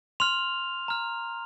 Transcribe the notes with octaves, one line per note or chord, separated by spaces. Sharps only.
C6 F6 F7
A#5 F6